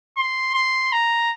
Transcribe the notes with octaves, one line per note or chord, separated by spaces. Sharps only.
C6
C6
A#5